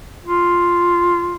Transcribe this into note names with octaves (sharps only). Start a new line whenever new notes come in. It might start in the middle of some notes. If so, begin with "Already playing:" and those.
F4